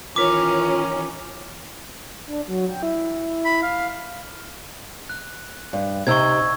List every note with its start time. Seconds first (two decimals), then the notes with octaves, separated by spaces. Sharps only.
0.16 D#3 E3 C#4 F4 A#4 D6 B6
2.27 D4
2.48 F#3
2.70 G5
2.82 E4
3.45 B5
3.63 F5
5.09 F#6
5.73 G2
6.07 C3 C4 D#4 C#6 E6 G#6